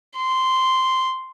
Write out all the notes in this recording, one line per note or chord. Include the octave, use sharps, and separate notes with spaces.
C6